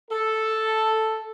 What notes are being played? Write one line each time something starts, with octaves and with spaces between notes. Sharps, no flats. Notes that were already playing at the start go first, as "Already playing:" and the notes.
A4